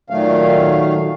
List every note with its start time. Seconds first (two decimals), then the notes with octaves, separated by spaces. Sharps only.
0.10 A#2 D#3 F#3 A3 F5